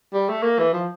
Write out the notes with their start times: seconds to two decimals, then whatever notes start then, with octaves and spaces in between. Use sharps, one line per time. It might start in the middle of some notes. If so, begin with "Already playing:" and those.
0.13 G3
0.29 A3
0.43 A#3
0.59 E3
0.73 F3